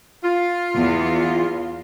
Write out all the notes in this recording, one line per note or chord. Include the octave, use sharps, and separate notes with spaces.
F4
E2